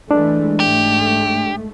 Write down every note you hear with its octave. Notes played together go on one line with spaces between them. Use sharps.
E3 G#3 A3 D4
G#2 A3 G4